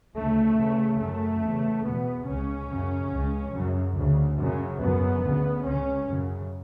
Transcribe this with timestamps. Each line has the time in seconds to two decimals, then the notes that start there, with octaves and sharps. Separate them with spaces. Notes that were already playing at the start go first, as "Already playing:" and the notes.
0.14 D2 C#3 A3
0.56 E2 C#3
0.98 F#2 C#3 A3
1.40 E2
1.45 C#3
1.83 E2 B2 B3
2.24 C#2 C#3 C#4
2.68 F#2 C#3
3.10 C#2 C#3
3.52 F#2 C#3
3.95 D2 C#3
4.36 F#2 C#3
4.79 F#2 C#3 B3
5.22 D2 C#3
5.64 C#2 C#3 C#4
6.06 F#2 C#3